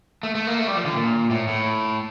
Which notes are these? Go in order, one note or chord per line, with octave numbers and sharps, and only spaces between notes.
A3
A3
A#3
A3
G3
F3
D3
A#2
A2
A2